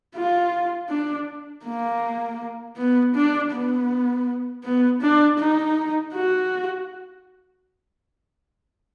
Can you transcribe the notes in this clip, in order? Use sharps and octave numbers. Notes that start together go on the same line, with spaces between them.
F4
D4
A#3
B3
D4
B3
B3
D4
D#4
F#4